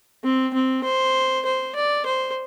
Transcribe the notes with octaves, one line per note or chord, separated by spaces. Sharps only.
C4
C4
C5
C5
D5
C5